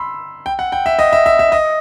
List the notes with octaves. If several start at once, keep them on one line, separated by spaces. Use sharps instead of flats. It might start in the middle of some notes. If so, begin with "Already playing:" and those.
Already playing: B5 C6 E6
G5
F#5
G5
E5
D#5
E5
E5
E5
D#5